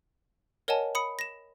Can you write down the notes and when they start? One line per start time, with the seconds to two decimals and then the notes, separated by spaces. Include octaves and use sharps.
0.68 A#4 C#5 D#5 F#5 G#5 A5
0.95 B5 D#6 C#7
1.19 A#6 E7